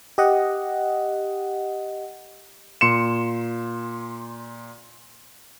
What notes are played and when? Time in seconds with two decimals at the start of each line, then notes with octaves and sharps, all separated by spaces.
0.18 G4 D#5 F#5
2.81 A#2 C6 C#7 E7